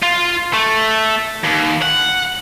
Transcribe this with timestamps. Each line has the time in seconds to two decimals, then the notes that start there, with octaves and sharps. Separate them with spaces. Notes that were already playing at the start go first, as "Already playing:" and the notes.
0.02 F4
0.53 A3
1.44 D#2
1.82 F#5